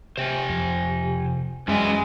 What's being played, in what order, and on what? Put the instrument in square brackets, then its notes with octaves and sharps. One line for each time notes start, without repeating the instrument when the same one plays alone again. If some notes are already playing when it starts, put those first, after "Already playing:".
[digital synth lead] C3 [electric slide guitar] C5 G5 G#5
[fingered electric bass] F2
[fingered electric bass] F#2 [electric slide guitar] E3 G3 E5 [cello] G#3 [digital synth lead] C#4